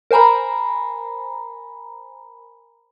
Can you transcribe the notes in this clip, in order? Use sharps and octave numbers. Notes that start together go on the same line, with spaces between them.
A#4 C5 G#5 A#5 B5